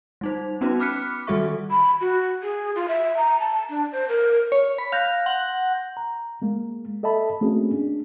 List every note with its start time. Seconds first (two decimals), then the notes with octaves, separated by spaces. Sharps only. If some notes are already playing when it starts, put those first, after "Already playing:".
0.21 G3 D#4 C5
0.61 B3 C#4 D#4 F#4 B4
0.80 B5 D6 F6 F#6 B6 C#7
1.27 D#3 G3 F#4 A4 E5 C#6
1.70 B5
2.01 F#4
2.43 G#4
2.75 F4
2.88 E5
3.17 A#5
3.40 A5
3.69 D4
3.92 C5
4.09 A#4
4.52 C#5
4.78 B5
4.92 F5 F#6 G6 A#6
5.26 F#5 C6
5.97 A#5
6.42 G#3 A#3
7.03 A4 D#5 E5 A5 B5
7.41 A3 A#3 C4 C#4 F#4 G#4
7.73 D4